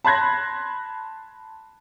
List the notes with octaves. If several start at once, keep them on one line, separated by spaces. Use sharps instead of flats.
A5 B5 C6 F#6 G#6 A#6